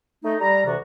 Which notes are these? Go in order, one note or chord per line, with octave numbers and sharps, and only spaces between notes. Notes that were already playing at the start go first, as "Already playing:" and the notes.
A3 D#4
G3 A#5
D2 C3 E3 F#4 D5